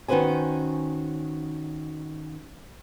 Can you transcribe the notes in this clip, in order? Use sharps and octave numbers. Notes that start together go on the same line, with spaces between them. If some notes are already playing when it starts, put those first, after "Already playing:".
D#3 C#4 F#4 B4 C5 G#5